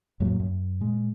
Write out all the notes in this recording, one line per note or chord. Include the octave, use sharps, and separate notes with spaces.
F2 A2 F#3 A#3
F#2
A#2 G#3